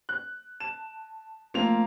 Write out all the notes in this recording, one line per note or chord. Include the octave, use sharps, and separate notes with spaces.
F#6
A5 E7
F3 A3 A#3 C4 F4 A#5 F7